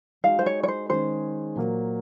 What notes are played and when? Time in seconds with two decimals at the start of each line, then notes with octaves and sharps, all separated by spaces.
0.24 G#3 D#4 F#4 F5
0.39 C5
0.46 C#5
0.63 C#5
0.68 C5
0.89 D#3 G#3 C#4 G#4 C5
1.56 A#2 F#3 A#3